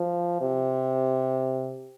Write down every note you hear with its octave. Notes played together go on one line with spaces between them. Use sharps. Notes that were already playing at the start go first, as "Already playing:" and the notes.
Already playing: F3
C3